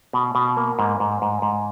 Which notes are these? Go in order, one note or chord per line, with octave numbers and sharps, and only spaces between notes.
B2
B2
A#3
G#2
G#2
G#2
G#2